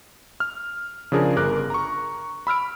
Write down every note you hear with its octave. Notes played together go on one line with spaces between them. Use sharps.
F6
C#3 F3 D4 G#4 A#4
G1 A#4 D6 F#6
A#5 C#6
B5 E6 F6 D7